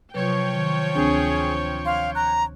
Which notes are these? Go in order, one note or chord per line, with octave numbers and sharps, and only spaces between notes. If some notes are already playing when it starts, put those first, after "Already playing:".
C3 F3 F#3 B4 C#5 G5
D#3
D2 C4 D4 G#4
F5 C6
A#5 F#6